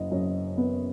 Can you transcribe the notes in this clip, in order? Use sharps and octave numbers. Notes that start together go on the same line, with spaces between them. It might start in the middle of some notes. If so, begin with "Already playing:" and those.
Already playing: F#1 D#5
F#2
B3